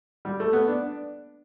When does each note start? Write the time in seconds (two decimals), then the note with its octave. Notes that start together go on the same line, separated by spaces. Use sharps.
0.25 G3
0.40 A3
0.53 B3
0.68 D4